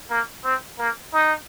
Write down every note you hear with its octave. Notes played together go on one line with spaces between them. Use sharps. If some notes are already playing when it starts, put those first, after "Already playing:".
A#3
C4
A#3
D#4